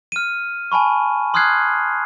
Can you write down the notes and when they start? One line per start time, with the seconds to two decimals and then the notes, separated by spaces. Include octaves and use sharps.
0.12 F6 D#7
0.72 G#5 A5 B5 C#6
1.34 C6 D#6 F6 F#6 G#6 C7